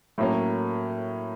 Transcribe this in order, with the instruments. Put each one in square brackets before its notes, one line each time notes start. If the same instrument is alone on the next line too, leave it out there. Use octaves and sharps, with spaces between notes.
[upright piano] A2 F#3 A#3 C#4